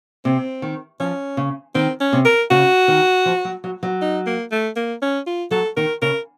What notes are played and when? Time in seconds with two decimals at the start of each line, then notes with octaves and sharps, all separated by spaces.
0.25 C3 C4
0.62 D#3
1.00 F3 C#4
1.37 C#3
1.75 D#3 C4
2.01 C#4
2.13 C3
2.25 A#4
2.51 C#3 F#4
2.88 D#3
3.26 F3
3.45 F#3
3.64 F#3
3.83 F#3
4.01 D#4
4.27 A#3
4.51 A3
4.76 A#3
5.02 C#4
5.27 F4
5.51 F#3 A4
5.77 D#3 A#4
6.02 C#3 A#4